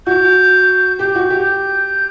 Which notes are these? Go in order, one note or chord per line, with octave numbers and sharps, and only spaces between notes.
F#4 G6
G4 G6
F#4
G4